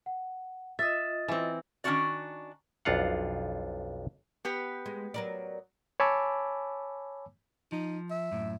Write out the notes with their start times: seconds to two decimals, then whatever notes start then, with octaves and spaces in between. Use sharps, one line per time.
0.06 F#5
0.79 F4 D#5 E5 D#6 A6
1.28 E3 C4
1.84 D#3 C#4 D4 E4 F#4 D5
2.85 B1 F2 D4 F4 F5 F#5
4.45 B3 G4 B4
4.86 G#3
5.14 F#3 A#4 D5
6.00 C#5 G#5 A5 B5 D6 E6
7.72 F3 D#4
8.11 E5
8.31 F#2 A2